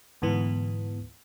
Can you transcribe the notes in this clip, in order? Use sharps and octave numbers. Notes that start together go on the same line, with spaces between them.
D2 G#2 E3 B3